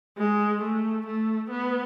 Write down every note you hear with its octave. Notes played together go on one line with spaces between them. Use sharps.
G#3
A3
A3
B3